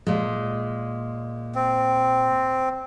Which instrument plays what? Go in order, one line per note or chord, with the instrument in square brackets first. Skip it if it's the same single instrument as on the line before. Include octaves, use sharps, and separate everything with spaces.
[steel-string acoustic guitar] A#2 G#3
[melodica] C4